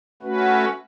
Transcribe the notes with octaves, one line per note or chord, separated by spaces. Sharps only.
A3 C#4 F#4 B4